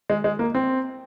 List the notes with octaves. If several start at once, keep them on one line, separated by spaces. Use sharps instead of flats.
G#3
G#3
A#3
C4